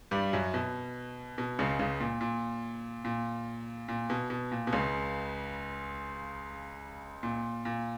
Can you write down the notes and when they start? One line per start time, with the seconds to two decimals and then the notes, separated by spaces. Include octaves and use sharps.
0.11 G2 G3
0.33 F#2 F#3
0.54 B2
1.38 B2
1.59 C#2 C#3
1.79 C#2 C#3
2.00 A#2
2.21 A#2
3.05 A#2
3.88 A#2
4.10 B2
4.30 B2
4.52 A#2
4.67 B2
4.73 C#2 C#3
7.23 A#2
7.65 A#2